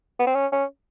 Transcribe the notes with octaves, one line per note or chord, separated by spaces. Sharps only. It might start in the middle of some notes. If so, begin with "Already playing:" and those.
B3
C4
C#4
C#4